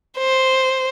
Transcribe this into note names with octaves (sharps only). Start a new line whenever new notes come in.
C5